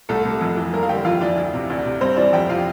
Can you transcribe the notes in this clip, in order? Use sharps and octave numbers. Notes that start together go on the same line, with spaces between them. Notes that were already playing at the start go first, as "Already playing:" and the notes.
C2 A3 A4
C3
F2
E3
G2 A#3 A#4
F5
D3 G4 G5
F2 F4 F5
E3 D4 D5
D2
C3
D2 D4 D5
C3
G2 C4 C5
E3 D4 D5
F2 G4 G5
C3 F4 F5